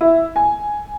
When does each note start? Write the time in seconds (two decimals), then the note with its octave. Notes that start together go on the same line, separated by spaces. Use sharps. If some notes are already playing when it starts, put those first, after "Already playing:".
0.01 E4
0.36 G#5